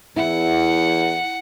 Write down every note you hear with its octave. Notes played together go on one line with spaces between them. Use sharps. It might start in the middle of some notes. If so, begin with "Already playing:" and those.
E2 E4 F#5